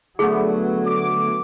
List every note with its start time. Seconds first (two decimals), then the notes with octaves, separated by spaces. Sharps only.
0.19 D3 F#3 A3 B3 G#4
0.86 D6